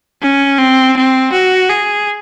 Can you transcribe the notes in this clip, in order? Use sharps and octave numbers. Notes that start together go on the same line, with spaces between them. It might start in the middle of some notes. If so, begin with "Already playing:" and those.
C#4
C4
C4
F#4
G#4